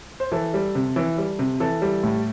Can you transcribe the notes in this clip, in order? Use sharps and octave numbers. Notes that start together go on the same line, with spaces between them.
C5
E3 A4
G3
C3
E3
G3
C3
E3 A4
G3
A2